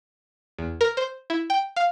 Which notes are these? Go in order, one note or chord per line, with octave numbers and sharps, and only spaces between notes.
E2
A#4
C5
E4
G5
F5